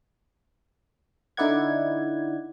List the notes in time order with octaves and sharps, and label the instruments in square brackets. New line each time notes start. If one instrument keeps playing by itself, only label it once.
[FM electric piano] D3 D#4 E4 D5 F#5 G#6